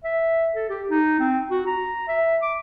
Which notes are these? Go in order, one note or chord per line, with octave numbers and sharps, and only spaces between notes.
E5
A4
G4
D#4
C4
F#4
A#5
E5
D6